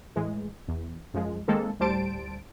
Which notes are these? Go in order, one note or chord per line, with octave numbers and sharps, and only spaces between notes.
A2 E3 G#3
E2
F#2 F3 G#3
D#3 G#3 A#3 C4 A4
D2 A2 G3 C5 A5 D7